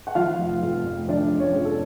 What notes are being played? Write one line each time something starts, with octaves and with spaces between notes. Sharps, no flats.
F#5
F3 F4 F5
F1
F2
F1
F3 D4 D5
F1
C#4 C#5
F2
A4